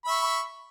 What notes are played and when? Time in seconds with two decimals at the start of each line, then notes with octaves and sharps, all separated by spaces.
0.04 B5
0.08 E5
0.11 C#6